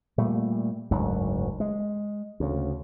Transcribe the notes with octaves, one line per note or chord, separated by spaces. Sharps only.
A#2 G3 A3
F#1 D2 G#2 F#3
G#3
D2 C#3